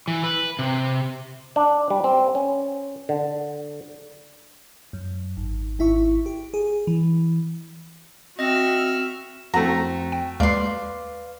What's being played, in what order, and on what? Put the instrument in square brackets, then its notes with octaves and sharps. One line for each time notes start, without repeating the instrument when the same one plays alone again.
[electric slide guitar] E3
B4
C3
[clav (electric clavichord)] D4
G3
C4
C#4
D3
[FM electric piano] F#2
G#1
G#1 E4 E5 C#6
G4
G#4
E3
[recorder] C4 [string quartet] F#4 E5 F6 [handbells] D#5 A#6
[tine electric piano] F2 C4 [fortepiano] A3 F#4 [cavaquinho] A#5
[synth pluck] G5
[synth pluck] D#2 G#3 [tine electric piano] B4 F5 [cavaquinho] D5 C6